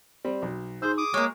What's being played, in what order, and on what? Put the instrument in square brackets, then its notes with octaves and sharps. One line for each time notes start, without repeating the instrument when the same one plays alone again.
[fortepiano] G3 C4
B1
[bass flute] D#4 [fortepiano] G#4 C6 E6 [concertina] C5
[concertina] D6 D#6
[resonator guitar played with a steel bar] G#3 A#3 [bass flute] C#5 [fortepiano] C#6